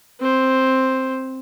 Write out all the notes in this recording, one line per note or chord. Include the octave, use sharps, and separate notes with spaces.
C4 C5